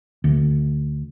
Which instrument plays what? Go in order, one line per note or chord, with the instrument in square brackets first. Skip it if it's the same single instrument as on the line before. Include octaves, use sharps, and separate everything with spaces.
[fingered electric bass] D2